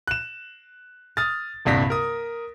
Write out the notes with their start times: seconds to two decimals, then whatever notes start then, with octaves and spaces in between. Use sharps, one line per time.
0.07 F#6 E7
1.17 D#6 F6 A6
1.65 D#1 C2 G2 A#6 B6
1.90 A#4 D#6